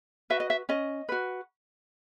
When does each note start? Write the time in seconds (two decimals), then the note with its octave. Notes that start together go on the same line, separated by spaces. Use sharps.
0.30 F#4 B4 E5
0.40 D#5
0.50 E5
0.69 C#4 D#5
1.09 F#4 B4